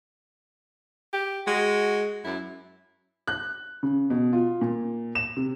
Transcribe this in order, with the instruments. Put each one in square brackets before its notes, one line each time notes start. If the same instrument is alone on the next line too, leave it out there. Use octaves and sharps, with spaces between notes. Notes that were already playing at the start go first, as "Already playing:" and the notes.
[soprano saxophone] G4
[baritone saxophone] G#3 [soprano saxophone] F#4
[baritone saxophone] F#2 [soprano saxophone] E4
[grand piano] F#6
C#3
B2
F4
A#2
E7
C3